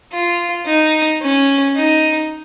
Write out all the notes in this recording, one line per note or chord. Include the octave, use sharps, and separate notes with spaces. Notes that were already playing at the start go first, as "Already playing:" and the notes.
F4
D#4
C#4
D#4